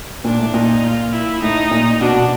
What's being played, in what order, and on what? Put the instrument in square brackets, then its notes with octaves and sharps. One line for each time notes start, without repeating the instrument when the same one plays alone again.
[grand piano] A#2 [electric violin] D4
[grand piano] A2
[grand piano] A#2 [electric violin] D#4
[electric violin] F4
E4
[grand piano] A2 [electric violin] D#4
[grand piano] A#2
[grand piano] B2 [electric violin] D4